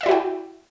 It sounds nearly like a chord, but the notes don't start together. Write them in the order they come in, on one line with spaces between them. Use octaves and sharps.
E5 D5 E4 F#4 G5